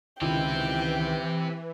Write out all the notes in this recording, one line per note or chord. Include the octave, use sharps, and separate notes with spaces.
C#2 D#3 E3 C4 E4 G4 G5